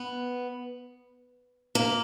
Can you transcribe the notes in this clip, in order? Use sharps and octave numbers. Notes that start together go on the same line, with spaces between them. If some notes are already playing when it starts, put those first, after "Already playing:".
Already playing: B3
A#3